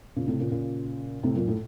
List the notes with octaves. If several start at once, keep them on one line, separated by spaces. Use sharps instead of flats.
A#2 C#3
A2 C3
A#2 C#3
A#2 C#3
A2 C3
F#2 A#2
A2